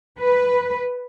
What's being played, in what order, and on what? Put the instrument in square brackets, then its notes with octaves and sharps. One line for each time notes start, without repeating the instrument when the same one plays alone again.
[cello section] B4